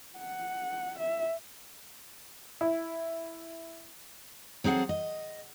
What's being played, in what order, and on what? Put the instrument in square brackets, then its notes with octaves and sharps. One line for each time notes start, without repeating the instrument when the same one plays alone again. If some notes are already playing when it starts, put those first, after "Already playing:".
[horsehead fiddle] F#5
E5
[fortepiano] E4
[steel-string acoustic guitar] F#3 C4 G#4 A4 F#5
D#5